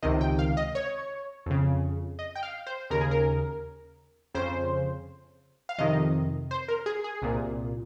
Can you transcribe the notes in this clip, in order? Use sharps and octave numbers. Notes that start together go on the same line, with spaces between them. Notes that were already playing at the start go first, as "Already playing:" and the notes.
C#2 C3 D#3 D#5
G5
F5
D#5
C#5
F2 C#3
D#5
G5
F5
C5
D#2 C#3 A#4
G#4
A#4
F2 C#3 C5
F5
F2 C3 D#3 D#5
C5
A#4
G#4
G#4
C2 A#2